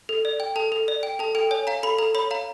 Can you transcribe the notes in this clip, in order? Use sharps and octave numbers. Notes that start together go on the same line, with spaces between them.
A4
D5
G5
A4 A5
A4
D5
G5
A4 A5
A4 G5
C#5 G#5
F5 A#5
A4 B5
A4 A#5
C#5 B5
F5 A#5